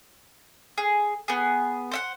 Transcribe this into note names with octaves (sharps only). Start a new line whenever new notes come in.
G#4
B3 G#4
C5 E5 F#5